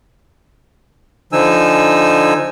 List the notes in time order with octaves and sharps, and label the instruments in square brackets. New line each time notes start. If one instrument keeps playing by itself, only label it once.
[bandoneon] D3 F3 D#4 G#5 E6